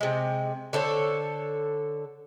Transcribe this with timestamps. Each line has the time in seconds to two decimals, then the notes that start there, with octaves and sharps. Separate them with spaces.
0.01 C3 G#3
0.73 D3 A4 C5 C#5